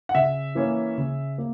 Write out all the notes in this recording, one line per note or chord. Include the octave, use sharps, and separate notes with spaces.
F#5
C#3 E5
E3 A#3 C#4
C#3
A#3